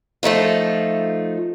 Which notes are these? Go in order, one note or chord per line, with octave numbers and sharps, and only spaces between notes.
F3 A3 D#4 F4